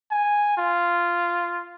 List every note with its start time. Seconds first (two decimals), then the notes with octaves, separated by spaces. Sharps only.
0.11 G#5
0.58 F4